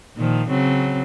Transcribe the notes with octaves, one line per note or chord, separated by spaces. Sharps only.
A#2 D#3 F3
C#3 F#3 C4